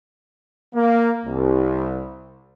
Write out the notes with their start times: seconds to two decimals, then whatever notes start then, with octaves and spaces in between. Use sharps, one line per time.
0.75 A#3
1.26 C2